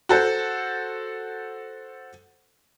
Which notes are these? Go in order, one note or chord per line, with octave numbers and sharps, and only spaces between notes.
F#4 A4 C5